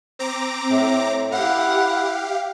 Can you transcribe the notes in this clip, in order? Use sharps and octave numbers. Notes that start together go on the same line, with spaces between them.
C4 A#5 D6
A2
E4 G4 F5 F#5